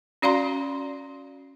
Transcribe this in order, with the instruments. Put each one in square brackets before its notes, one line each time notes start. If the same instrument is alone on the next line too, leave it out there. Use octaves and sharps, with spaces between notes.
[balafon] C#4 F#4 D5 F5 A#5 C6